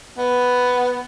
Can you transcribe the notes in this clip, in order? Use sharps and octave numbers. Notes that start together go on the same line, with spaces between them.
B3